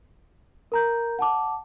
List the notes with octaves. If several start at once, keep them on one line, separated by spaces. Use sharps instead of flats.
A#4 A#5 G6
F#5 A5 D6